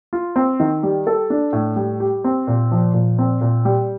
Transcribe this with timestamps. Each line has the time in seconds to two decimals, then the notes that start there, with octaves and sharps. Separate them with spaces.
0.13 F4
0.36 C4
0.60 D#3
0.83 G3
1.07 A4
1.30 D4
1.53 A2
1.76 G3
2.00 G4
2.24 C4
2.47 A#2
2.71 F3
2.94 A#2
3.18 C4
3.41 A#2
3.65 G3